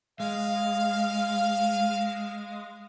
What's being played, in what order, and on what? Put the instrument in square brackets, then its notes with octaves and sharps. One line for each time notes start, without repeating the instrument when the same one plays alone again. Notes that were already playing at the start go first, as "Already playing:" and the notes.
[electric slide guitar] G#3 [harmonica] F5